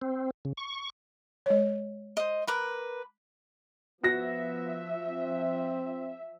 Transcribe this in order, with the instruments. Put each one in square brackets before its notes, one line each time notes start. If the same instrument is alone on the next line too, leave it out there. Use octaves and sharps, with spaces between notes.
[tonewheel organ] C4
C#3
C#6
[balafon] G#3 C#5
[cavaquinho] C5 D#5
A#4 B4 D6
[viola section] F3 E5 [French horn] B3 [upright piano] F#4 A#6
[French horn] C4